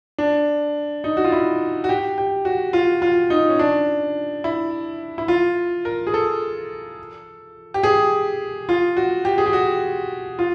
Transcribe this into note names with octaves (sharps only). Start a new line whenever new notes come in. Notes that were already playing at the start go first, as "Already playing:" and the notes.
D4
D#4
F#4
F4
E4
F#4
G4
G4
F#4
F4
F4
D#4
C#4
D4
E4
E4
F4
A#4
G#4
A4
G4
G#4
F4
F#4
G4
G#4
G4
F#4
F4